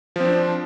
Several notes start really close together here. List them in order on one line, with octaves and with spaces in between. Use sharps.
F3 C4 D4